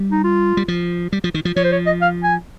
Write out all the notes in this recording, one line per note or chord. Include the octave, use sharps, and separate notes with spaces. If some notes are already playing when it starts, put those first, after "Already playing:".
Already playing: G3
D#4
F4
G3
F3
G3
F3
D#3
F3
F3 C#5
C5
C#5
D#5
F5
G#5